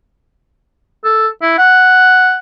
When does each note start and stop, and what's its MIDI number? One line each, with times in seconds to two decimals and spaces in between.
1.04 1.27 69
1.42 1.57 64
1.58 2.38 78